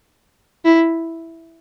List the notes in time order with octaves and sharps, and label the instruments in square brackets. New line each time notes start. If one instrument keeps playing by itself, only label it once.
[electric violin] E4